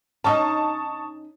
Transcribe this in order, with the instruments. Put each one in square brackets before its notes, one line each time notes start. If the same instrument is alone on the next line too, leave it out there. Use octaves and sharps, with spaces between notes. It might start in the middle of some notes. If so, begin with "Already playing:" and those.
[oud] C#4 D#4 [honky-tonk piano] A5 C#6 D#6